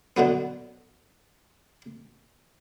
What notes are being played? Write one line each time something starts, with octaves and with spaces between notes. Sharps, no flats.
B2 D3 F#3 B3